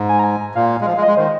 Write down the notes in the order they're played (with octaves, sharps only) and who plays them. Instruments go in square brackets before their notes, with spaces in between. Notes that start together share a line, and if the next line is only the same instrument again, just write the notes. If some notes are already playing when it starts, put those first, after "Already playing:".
Already playing: [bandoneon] G#2
[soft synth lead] G#5
A#5
G#5
[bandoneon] A#2 [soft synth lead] F5
[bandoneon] G#3
[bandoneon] F3 [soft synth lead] F5
[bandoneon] G#3
[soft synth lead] D#5
[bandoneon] G#3
[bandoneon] D#3 [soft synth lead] C5